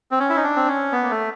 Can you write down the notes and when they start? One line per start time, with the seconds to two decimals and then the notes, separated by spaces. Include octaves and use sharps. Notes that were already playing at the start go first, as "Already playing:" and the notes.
0.11 C4
0.20 C#4
0.29 E4
0.37 D#4
0.43 D4
0.56 C4
0.68 C#4
0.92 B3
1.03 A#3
1.10 A3